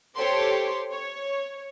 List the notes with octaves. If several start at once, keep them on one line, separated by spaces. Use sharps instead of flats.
G4 A4 C5 C#5 C6 D6
C#5